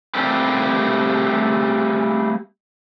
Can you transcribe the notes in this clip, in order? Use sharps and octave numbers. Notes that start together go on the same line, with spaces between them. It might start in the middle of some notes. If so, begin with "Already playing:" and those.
G3 A3 A#3 C4 G4